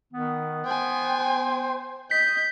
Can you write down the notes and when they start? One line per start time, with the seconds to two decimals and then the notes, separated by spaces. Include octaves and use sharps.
0.13 D#3 B3
0.65 C5 G5 G#5
2.11 D#5 G6 B6